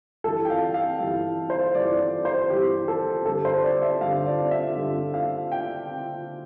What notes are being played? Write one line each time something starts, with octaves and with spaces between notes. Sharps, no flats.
G2 E3 A4
G5
F5
F5
G2 E3
C5
G2 E3 D5
D5
C5
G2 E3 G4
A4
G2 D3 A4
C5
D5
E5
G2 D3 F5
D5
E5
G2 D3
F5
G5